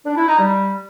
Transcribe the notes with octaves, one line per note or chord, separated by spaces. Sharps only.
D4
E4
D#4
G3